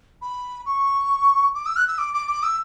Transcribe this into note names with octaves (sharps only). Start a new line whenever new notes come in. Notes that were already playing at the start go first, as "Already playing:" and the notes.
B5
C#6
D6
E6
F#6
E6
D6
D6
D6
E6